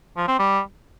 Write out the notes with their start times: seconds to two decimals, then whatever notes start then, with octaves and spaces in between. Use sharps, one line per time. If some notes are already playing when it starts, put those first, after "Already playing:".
0.17 F3
0.28 C4
0.39 G3